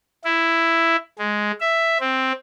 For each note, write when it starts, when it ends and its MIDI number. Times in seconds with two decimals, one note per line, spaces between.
0.25 0.96 64
1.19 1.52 56
1.60 1.98 76
2.00 2.32 60